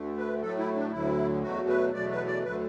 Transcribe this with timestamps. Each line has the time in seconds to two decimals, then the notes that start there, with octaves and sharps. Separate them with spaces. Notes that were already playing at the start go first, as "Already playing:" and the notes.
Already playing: D2 D3 A3
0.17 B4
0.42 A2 F#3 A3 A4
0.58 E4
0.76 D4
0.92 D2 D3 F#3 E4
1.43 E2 B2 F#3 A3 F#4
1.68 B4
1.93 E2 B2 F#3 A3 D5
2.11 B4
2.27 D5
2.44 D2 D3 F#3 A3 B4